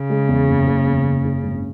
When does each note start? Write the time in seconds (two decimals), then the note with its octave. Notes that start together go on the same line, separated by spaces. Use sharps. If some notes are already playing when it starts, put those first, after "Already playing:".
Already playing: C#3
0.10 G#3
0.29 E2
0.48 F#1
0.67 F#1
0.86 E2
1.06 F#1
1.24 F#1
1.44 G#1